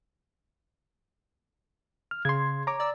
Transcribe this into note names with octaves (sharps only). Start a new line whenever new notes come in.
F6
C#3 C6 G#6
C#5 A#5 D6
D5 E6